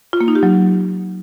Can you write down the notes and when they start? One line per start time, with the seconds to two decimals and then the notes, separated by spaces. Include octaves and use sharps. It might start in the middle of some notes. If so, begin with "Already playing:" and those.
0.13 F4
0.21 A#3
0.28 D#4
0.35 G4
0.43 F#3